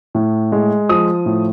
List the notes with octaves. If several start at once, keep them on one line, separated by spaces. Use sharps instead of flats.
A2
G#3
F3 D#6
A2